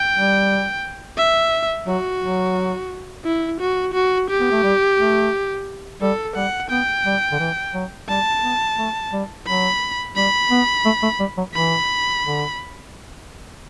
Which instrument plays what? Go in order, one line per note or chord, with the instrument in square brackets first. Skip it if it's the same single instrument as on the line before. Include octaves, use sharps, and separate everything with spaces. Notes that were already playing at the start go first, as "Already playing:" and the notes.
Already playing: [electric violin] G5
[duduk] G3
[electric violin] E5
[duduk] F#3 [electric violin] F#4
[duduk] F#3
[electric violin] E4
F#4
F#4
G4
[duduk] B3
A3
G3
A3
[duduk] G3 [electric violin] A4
[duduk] G3 [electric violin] F#5
[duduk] B3 [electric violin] G5
[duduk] G3
D3
E3
F#3
[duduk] G3 [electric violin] A5
[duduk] B3
A3
G3
[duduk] F#3 [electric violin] B5
[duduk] G3 [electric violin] B5
[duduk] B3
A3
A3
G3
F#3
[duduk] E3 [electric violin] B5
[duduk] D3